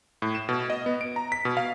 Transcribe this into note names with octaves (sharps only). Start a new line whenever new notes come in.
A2
E7
B2
D#5
B3
D7
A#5
B6
B2
F5